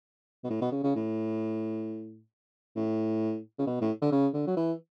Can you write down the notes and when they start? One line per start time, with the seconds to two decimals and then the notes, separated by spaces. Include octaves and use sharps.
0.44 B2
0.50 A2
0.61 B2
0.72 C#3
0.83 C#3
0.95 A2
2.76 A2
3.59 C#3
3.67 B2
3.81 A2
4.02 D3
4.12 C#3
4.34 D3
4.47 F#3
4.57 E3